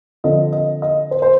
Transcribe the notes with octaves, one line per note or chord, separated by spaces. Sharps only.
D3 F3 C4 D#5
D#5
D#5
C5
C5